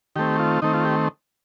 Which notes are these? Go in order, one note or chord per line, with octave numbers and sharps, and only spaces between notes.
D#3 A3 C4 G4
F4
D#3 A3 C4 D#4
F4
G4